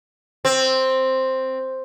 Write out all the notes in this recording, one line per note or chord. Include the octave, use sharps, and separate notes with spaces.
C4